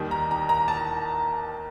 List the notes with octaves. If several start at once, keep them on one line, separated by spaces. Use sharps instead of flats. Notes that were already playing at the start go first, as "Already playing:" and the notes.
Already playing: D#2 D#3 G3
A#5
A#5
A#5
A5